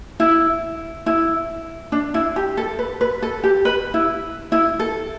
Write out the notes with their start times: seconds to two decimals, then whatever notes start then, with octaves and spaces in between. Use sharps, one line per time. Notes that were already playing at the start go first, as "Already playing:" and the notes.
0.20 E4
1.06 E4
1.92 D4
2.14 E4
2.36 G4
2.57 A4
2.79 B4
3.01 B4
3.22 A4
3.44 G4
3.65 B4
3.94 E4
4.52 E4
4.79 A4